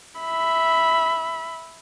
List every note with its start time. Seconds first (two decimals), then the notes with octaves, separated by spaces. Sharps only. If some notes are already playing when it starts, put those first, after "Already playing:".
0.20 E5 B5